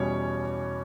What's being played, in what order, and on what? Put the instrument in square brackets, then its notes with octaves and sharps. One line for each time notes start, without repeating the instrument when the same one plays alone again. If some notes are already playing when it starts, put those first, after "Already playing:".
Already playing: [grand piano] E2 B2 G3 C#4 C#5